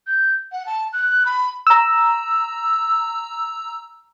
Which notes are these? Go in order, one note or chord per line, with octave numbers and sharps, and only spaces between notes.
G6
F#5
A5
F#6
B5
A#5 E6